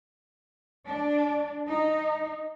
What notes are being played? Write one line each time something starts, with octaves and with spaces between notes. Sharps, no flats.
D4
D#4